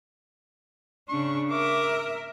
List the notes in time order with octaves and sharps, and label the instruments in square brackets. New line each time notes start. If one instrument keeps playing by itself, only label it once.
[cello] C#3 D4 [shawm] C#6
[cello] A#4 E5 [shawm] D6